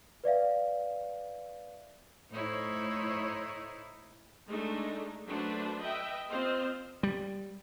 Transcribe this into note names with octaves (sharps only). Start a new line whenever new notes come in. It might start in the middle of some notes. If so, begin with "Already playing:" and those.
B4 D5 E5 F5
A2 D#4 E4 C5 C#5
G#3 A3 D4 D#4
F#3 A3 D4 B4 C5
B4 D#5 E5 G5
C4 F4 C5 D#5
G3